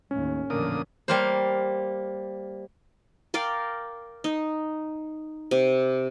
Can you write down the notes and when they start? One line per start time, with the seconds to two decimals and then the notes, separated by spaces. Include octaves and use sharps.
0.11 D#2 A2 C#4
0.50 A1 F2 A#2 D3 A#4 D#6
1.08 G3 A#3 C5
3.34 A#4 D5 F5 G5
4.24 D#4
5.51 C3